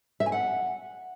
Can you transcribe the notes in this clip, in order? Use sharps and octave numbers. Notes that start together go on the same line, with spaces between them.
E5
G#5
F#5